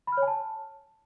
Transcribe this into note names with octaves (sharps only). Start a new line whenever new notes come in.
B5
F6
C#5
G#5
A5